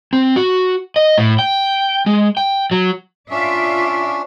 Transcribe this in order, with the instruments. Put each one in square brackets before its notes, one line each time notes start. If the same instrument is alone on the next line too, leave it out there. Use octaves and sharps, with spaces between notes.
[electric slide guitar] C4
F#4
D#5
A2
G5
G#3
G5
F#3
[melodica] C#4 D4 [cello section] F4 D5 E5